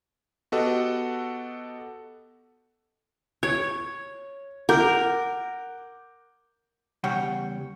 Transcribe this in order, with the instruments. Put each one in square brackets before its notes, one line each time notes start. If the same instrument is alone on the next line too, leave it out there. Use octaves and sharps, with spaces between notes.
[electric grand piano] B3 F#4 G4 A4 D#5 F#5
[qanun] C#5 [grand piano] G#6
[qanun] A#4 [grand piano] F#5 D6 G6
[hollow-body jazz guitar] E2 C#3 G3 C#5 F#5 G5